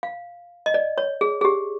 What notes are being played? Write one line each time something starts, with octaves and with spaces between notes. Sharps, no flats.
F5
D#5
D5
C#5
G#4
G#4
G4